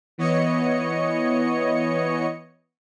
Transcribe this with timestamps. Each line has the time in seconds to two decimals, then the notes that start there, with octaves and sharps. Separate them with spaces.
0.18 E3 B3 C#5 D#5 C#7